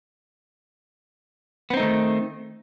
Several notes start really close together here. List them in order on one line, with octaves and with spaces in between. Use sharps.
B3 C4 D#4 A3 D#3